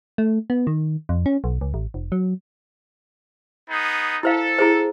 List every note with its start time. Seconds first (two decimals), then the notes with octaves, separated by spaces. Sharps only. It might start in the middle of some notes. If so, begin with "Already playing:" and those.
0.18 A3
0.50 B3
0.67 D#3
1.09 F2
1.26 C#4
1.44 B1
1.61 C#2
1.74 A1
1.94 F1
2.12 F#3
3.69 B3 D#4 G#4
4.23 E4 A4 C5 F5
4.59 E4 G#4 C5